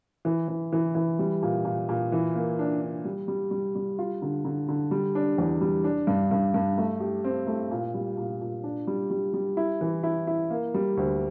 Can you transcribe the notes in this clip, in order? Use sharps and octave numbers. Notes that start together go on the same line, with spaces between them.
E3
E3
E3
E3
G3
A#2
A#2
A#2
E3
A#3
D4
D4
G3
G3
G3
G3
F4
D3
D3
D3
G3
D4
E2
G3
D4
G2
G2
G2
A3
G4
C4
A3
A#2
G3
A#2
A#2
D4
G3
G3
G3
E4
E3
E4
E4
A#3
G3
D2